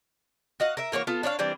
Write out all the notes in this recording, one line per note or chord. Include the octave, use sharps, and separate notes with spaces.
F#4 D#5 F5 F#5
A#4 E5
E3 A#3 F#4 C#5
B3 F4 A4
D4 C#5 D5 F5
E3 G3 C4 D4